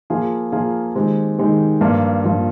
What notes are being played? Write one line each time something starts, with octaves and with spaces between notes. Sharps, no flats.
F3 A#3 F4 G#4
F3 A#3 F4 G#4
D#3 G#3 C4 G4
D#3 G#3 C4 G4
G2 F3 A#3 F4
G2 F3 A#3 F4